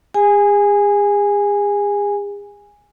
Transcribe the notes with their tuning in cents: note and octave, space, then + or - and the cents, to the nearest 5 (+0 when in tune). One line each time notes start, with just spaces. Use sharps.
G#4 -40 G#5 -10